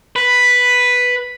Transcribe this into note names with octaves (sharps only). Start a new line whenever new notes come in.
B4